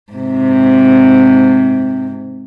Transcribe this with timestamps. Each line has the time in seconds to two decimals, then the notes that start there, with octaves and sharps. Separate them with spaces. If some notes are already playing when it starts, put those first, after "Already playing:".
0.12 G#2 C3